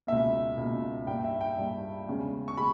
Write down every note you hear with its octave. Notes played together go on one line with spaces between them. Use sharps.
C#2 B2 A#3 E5
C#2 B2 A#3
G2 G3 A#3 G5
E5
G5
G2 G3 A#3
E2 C#3 G#3
C#6
G#3 B5